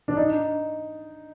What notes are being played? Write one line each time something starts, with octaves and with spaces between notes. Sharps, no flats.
D4
D#4